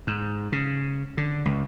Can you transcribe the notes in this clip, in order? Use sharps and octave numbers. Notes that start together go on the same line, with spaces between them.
G#2
C#3
D3
C#2